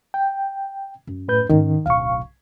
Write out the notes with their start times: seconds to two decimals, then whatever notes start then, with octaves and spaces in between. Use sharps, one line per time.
0.14 G5
1.07 F#2
1.28 A2 B4 G6
1.50 G#2 D#3 C#4
1.86 D1 B1 F5 C#6